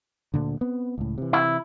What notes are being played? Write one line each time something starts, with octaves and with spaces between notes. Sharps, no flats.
D2 A#2 D3
B3 C4
C#2 A2
C3 E3
E4